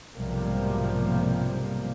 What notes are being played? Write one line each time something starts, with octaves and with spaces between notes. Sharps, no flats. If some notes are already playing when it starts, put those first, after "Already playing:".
B1 G#2 C3 F3 G3 A#3